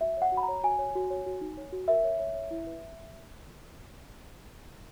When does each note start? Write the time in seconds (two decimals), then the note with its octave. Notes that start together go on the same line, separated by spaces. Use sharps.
0.01 F#4 E5
0.17 C#5 F#5
0.32 F#4
0.37 B5
0.43 A#5
0.48 C#5
0.63 F#4 G#5
0.79 C#5
0.95 F#4
1.10 C#5
1.26 F#4
1.41 D#4
1.57 C#5
1.72 F#4
1.88 A#4 E5
2.04 C#5
2.19 C#5
2.35 C#5
2.51 E4
2.67 B4